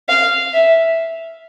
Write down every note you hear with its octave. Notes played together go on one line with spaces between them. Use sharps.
F5
E5